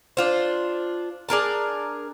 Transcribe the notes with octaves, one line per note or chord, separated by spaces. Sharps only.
D4 F4 C5
D4 G#4 A#4 A5